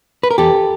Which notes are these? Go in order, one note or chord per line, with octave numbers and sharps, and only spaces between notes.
B4
A#4
E2 G4 A4